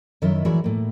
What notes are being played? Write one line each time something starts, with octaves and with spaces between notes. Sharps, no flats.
F#2 D#3 E4 A#4 D#5 E5
E3 G#3 E4 F#4 A#4 D5
A2 A#3